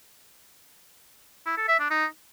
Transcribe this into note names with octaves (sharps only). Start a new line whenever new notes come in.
E4
A4
E5
D4
D#4